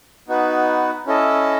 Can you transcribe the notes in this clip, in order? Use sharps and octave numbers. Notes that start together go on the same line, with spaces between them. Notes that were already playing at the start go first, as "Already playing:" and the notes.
B3 D#4 F#4 B4
C#4 E4 A4 D#5 A5